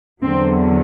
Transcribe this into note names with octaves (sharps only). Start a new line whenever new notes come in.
E2 D3 F#3 C4